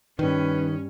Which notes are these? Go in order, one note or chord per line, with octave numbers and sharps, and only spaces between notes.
G2 D#3 C#4 B4 D#7